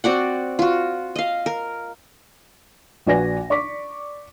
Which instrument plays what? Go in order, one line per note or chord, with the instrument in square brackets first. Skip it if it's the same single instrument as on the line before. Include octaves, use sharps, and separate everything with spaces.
[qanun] C4 F#4 D5 F#5
F4 F#4
D#5 F5
A#4
[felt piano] A#1 F#4 B4 D5 G#5 A#6
D5 C#6 D6 B6